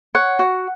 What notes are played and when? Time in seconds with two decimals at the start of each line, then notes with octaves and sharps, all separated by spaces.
0.15 C#5 F#5
0.39 F#4